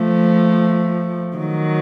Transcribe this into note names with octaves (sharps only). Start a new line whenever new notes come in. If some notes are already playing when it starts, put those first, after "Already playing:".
Already playing: F3 A3
D#3 F#3